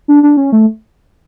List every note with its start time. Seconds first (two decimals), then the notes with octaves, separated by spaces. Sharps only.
0.08 D4
0.23 D4
0.37 C#4
0.52 A3